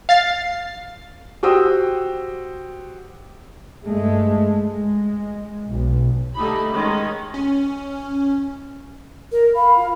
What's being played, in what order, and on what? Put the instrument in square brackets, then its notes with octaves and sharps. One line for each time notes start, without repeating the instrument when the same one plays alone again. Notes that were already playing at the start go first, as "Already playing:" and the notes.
[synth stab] F5 A6 C7
[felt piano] F#4 G4 C5 G5 D#6 E6
[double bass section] G2 G#3 A3
G#3
B1
[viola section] D3 G3 A3 D#4 G4 B5
D#3 G#3 C#4
[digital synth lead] C#4
[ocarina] A#4
[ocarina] F5 [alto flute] B5
[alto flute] F4